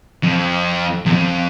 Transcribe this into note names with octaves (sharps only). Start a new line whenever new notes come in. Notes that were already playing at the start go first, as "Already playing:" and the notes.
F2
E2
F2